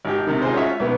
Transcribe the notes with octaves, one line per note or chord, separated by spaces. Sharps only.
G#1 G4
C3 D#3
D#4 F4 G#4 C5
C#4 F4 F#4 C#5 E5
B1 B3 B4